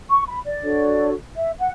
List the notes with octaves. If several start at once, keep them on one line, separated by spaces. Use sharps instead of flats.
C#6
B5
D5
D4 F#4 A4 C#5
E5
F#5